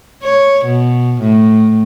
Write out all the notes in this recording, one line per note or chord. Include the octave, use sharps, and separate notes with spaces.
C#5
B2
A2